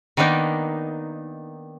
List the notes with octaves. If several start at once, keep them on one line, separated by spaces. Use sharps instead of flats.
D#3 A#3 B3 D4 D#4